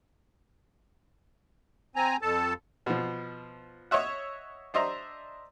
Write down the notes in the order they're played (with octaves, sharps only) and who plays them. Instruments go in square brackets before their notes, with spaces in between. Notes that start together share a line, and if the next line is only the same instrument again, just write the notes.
[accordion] C4 G#5 A#5
F2 A4 A5
[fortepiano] B2 F3
C#5 D#5 E5 F#5
D4 C5 D#5 E5 A#5